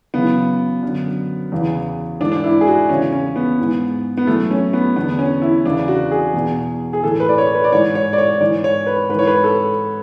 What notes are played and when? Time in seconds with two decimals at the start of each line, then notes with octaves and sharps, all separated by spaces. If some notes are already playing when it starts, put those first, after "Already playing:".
0.14 F#2 C#3 E3 B3
0.83 F#2 D3
1.52 E2 C#3 E3
2.20 G#2 E3 D4
2.32 D4
2.44 E4
2.61 G#4
2.67 F#4
2.89 E2 C#3 E3 C#4
3.13 C#4
3.36 B3
3.59 G#2 E3
4.17 B3
4.27 F#2 E3 A3
4.51 C#4
4.73 B3
4.96 E2 D3 B3
5.19 C#4
5.42 E4
5.66 E2 C#3 E3 D4
5.88 F#4
6.11 G#4
6.34 E2 B2
6.93 G#4
7.03 A2 E3 A4
7.20 B4
7.29 D5
7.38 C#5
7.55 B4
7.64 D5
7.72 G#2 E3 C#5
7.95 C#5
8.13 D5
8.18 C#5
8.41 G#2 E3 D5
8.64 C#5
8.86 B4
9.09 G#2 B4
9.14 E3 C#5
9.27 B4
9.44 A4